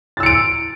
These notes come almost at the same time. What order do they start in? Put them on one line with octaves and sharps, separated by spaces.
A6 E6 C#7 D7